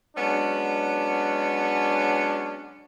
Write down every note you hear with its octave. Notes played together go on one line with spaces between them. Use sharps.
F#3 G#3 B3 C#4 D4